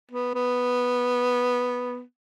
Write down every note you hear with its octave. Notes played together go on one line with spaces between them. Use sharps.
B3
B3